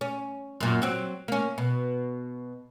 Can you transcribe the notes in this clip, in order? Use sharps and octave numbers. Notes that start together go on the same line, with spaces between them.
C#4
F#2 A#2
F#3 C4
A#3 C#4
B2